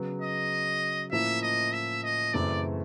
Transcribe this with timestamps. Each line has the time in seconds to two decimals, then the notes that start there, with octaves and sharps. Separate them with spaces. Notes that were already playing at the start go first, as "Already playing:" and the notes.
Already playing: C#3 F#3 B3
0.22 D#5
1.12 A2 F3 A#3 C#4 E4 E5
1.42 D#5
1.73 E5
2.04 D#5
2.33 F#2 C#3 E3 A3 C4 D5